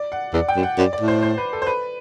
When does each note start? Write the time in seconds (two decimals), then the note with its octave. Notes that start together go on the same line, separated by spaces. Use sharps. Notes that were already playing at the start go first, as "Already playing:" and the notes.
Already playing: D5
0.12 F#5
0.33 E2 D5
0.48 G5
0.56 F#2
0.63 F#5
0.78 F#2 D5
0.93 D5
1.00 A2
1.08 C5
1.23 C5
1.38 B4
1.53 A4
1.62 C5
1.66 B4